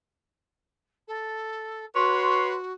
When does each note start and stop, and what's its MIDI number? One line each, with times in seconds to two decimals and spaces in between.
1.07 1.85 69
1.94 2.73 66
1.94 2.55 71
1.94 2.55 73
1.94 2.55 84